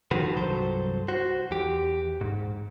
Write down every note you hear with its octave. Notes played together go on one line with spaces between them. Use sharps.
D3 D#3 F3 F#4 B4
C2 G2 F#3 A4 C5
F#4 C5
E2 G4
G#2